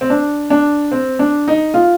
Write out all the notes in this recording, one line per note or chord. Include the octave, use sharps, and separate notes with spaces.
C4
D4
D4
C4
D4
D#4
F4